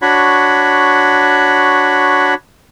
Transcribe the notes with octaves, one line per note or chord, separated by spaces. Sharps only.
D4 F#4 C#5 B5